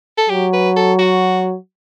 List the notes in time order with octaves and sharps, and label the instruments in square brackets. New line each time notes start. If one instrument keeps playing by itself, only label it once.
[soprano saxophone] A4
[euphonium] F#3 [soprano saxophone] G4
[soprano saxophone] B4
A4
F#4